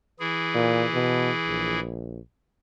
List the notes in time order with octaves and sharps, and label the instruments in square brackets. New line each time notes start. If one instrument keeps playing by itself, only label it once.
[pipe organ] E3 E4 G#4
[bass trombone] A#2
B2
A#1